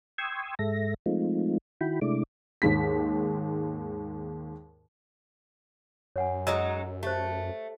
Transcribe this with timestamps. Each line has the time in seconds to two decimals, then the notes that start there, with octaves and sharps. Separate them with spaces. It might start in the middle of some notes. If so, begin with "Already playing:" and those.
0.18 G5 C6 C#6 D#6 E6 G#6
0.59 G#2 G#3 A4 E5 A#6
1.06 F3 G#3 A3 C4 D#4 F4
1.81 D#3 E4 F#4 G5 B5
2.01 C3 G#3 A3 D4 E4 D6
2.62 D#2 G#2 B6
6.16 F#2 C#5 F#5 G#5
6.47 F#3 G#3 D#4 C#5 D#5 E6
7.03 A3 G4 C5